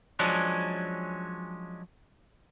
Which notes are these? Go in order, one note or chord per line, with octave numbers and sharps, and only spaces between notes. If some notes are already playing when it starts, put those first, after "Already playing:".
F3 F#3 G#3 C#4 D4